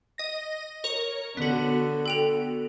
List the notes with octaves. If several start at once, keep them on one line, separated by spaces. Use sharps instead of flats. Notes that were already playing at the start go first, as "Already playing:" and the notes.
D#5 A#6
A#4 C#5
D3 B3 F#4
A4 G5 F7